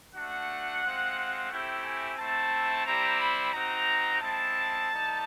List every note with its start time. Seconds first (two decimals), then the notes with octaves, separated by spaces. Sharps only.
0.14 A3 D4 F#4 F#5
0.82 G#3 C4 F4
1.50 A3 C4 E4 G4 G5
1.84 G#5
2.18 A3 C4 E4 A5
2.85 G3 C4 E4 G4 A#5
3.19 B5
3.53 C4 D#4 F#4 A#5
4.21 G#3 C4 E4 A5
4.89 G3 A#3 D#4